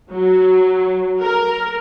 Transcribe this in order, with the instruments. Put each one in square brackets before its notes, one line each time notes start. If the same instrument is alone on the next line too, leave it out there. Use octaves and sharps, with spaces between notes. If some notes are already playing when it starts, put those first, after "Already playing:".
[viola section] F#3
A#4